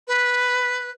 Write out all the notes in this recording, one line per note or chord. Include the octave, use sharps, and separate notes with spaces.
B4